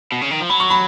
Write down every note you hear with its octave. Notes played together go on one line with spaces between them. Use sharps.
B2
C#3
D#3
F3
F#3 B5
C#6
B5